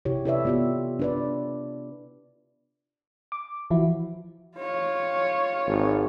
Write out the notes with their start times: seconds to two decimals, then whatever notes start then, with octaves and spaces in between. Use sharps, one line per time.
0.05 C3 E4 G4 C#5
0.25 E4 A4 B4 C#5 D5 E5
0.45 B3 F4 G4
0.99 D4 B4 D5
3.32 D6
3.70 E3 F3 E4 F#4
4.57 F4 C#5
5.67 G#1